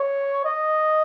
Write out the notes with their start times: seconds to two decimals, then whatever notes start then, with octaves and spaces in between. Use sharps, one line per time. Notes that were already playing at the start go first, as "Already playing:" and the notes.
Already playing: C#5
0.45 D#5